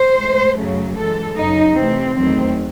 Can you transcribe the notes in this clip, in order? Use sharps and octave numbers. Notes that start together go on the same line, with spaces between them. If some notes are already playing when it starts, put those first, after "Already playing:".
Already playing: C5
A2 G#3
F#2 C#3 F#3 A3
F#2 E3 G#3 A4
F#2 C#3 F#3 D#4
C3 E3 A3 C4
E2 D#3 F#3 A3 C4